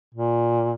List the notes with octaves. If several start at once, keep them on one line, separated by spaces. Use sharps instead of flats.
A#2